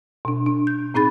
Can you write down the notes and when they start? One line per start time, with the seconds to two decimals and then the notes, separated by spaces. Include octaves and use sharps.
0.25 B2 D4
0.46 D4
0.67 G6
0.94 A2 C4 D#4 G#4 B5 A6